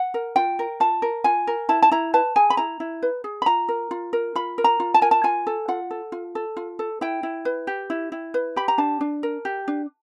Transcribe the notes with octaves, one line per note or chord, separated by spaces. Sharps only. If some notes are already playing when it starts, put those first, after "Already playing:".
Already playing: F#5
A#4
F4 G5
A#4
F4 A5
A#4
F4 G#5
A#4
E4 A5
A5
E4 A#5
B4 A5
G#4 G#5
B5
E4 A#5
E4
B4
G#4
B5
F4 A#5
A#4
F4
A#4
F4 B5
A#4
A#5
F4
A5
A#4 G#5
A5
F4 G#5
A4
F4 F#5
A4
F4
A4
F4
A4
E4 G5
E4
B4
G4
E4
E4
B4
G4 B5
A#5
D4 A5
D4
A#4
G4
D4